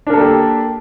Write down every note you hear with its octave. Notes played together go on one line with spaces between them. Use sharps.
A#3 D4 G4 A4 A#4